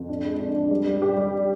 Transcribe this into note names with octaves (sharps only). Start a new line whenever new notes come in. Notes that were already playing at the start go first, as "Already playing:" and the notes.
Already playing: F2
D4
G#3
D4
D4
G3
G3
G4
G3